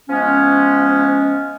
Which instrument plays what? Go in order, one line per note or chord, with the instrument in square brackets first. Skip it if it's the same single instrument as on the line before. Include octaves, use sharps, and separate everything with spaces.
[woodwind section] F3 G#3 B3 C#4